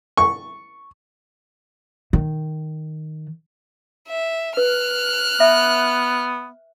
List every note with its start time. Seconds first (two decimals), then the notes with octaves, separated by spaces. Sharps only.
0.17 C#6
2.13 D#3
4.08 E5
4.57 B4 F6 F#6
5.40 B3 E5